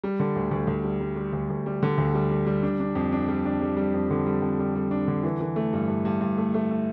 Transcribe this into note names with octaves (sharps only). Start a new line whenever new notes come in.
G3
D3
D2
D2
D2
G3
G3
G3
D2
D2
G3
D3
D2
G3
G3
G3
D4
D4
F2
D4
G3
D4
G3
G3
F2
D3
G3
F2
G3
G3
D4
D3
E3
E3
A3
G2
G2
G2
G2
A3
A3
A3